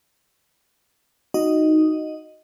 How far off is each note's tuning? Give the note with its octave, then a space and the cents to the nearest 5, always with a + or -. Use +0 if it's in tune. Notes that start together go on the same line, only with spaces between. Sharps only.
D#4 +0 F#4 +0 D#5 +0